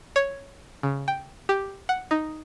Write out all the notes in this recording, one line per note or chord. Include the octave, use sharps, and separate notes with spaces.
C#5
C#3
G5
G4
F#5
D#4